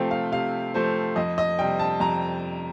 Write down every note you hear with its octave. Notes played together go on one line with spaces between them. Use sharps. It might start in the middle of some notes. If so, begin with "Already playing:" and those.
Already playing: C3 F3 A3 C4 F5 G5
F5
C3 F5
F3 A3 C4 C5
F2 D#5
D#5
C3 G3 G5
A5
F2 A#5